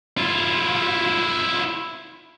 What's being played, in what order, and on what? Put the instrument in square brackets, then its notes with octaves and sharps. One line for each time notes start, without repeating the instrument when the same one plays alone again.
[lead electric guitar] E4 F4